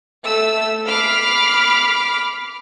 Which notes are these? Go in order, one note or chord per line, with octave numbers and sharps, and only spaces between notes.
A3 E6
B5 D6 F6 C7